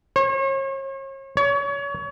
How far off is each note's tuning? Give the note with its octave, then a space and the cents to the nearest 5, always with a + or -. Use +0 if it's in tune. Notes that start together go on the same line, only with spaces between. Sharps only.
C#5 -40
C#5 +30